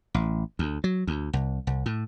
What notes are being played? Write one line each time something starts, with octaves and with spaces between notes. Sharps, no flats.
A1
D2
F#3
D2
C2
C2
A2